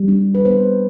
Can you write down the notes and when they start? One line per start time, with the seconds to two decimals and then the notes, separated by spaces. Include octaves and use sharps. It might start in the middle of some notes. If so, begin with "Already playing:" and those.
Already playing: G3
0.08 D4
0.35 B4
0.45 B3 C5